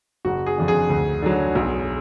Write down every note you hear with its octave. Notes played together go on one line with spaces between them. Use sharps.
F#1 F#4
G#4
F2 D3
G#4
D2
D3 F#3
B1